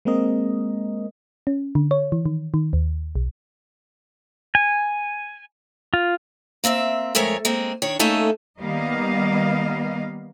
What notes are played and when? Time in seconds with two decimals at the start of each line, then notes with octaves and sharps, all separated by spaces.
0.05 G#3 A#3 C4 A#4 D#5
1.47 C#4
1.75 D3
1.91 C#5
2.12 E3
2.26 D#3
2.54 D#3
2.73 D#2
3.16 B1
4.55 G#5
5.94 F4
6.64 A#3 C4 D#5 E5
7.15 F2 G#3 A3 A#4 C#5
7.45 G#3 A#3 C4
7.82 D#3 D4 C#5
7.99 A3 A#3 C#4 D#4 A4
8.62 D#3 G3 A#3 B3 D#5 F5